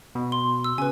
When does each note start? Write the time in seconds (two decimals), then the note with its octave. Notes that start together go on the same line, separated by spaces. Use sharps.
0.15 B2
0.32 C6
0.64 E6
0.78 C#3 B4 G#5